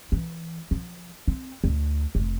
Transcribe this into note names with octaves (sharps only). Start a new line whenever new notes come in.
E3
F3
C4
D2
F1